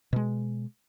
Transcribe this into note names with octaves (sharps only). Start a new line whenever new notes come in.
B2 G#3